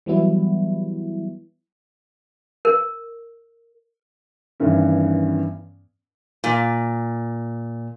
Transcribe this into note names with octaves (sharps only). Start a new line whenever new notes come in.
E3 F#3 G3 B3 E4
A#4
G2 D#3 E3 B3 C#4
A#2